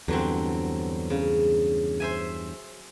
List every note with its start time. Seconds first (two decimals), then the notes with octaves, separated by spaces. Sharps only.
0.08 E2 G2 D3 F#3 C4
1.10 C#3
2.00 C5 E5 G#5